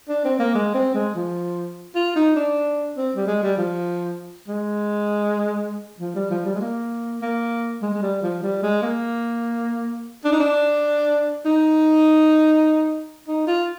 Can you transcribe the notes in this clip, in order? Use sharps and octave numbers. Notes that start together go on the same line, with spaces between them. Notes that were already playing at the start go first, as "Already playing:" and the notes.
D4
C4
A#3
G#3
C4
G#3
F3
F4
D#4
D4
C4
G3
G#3
G3
F3
G#3
F3
G3
F3
G3
G#3
A#3
A#3
G#3
G#3
G3
F3
G3
G#3
A#3
D4
D#4
D4
D#4
D#4
F4